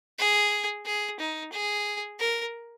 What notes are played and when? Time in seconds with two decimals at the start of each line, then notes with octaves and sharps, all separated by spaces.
0.19 G#4
0.86 G#4
1.20 D#4
1.52 G#4
2.19 A#4